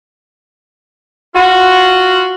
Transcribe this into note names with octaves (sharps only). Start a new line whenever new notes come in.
F4 F#4